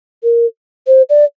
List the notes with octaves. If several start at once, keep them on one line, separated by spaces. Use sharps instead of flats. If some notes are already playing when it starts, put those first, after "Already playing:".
A#4
C5
D5